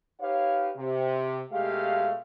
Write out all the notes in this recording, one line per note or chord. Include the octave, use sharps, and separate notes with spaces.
D#4 G4 B4 C#5 F5
C3
B2 G#3 A3 G4 F5